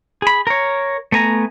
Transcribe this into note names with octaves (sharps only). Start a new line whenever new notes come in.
G#4 B5
A#4 C#5
A3 B3 G#5 A#5